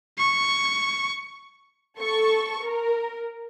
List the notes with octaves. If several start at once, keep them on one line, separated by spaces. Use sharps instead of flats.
C#6
A4 C#6
A#4